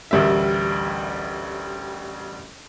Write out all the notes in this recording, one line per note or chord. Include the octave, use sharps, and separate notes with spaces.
A1 D2 G3 A#4 E5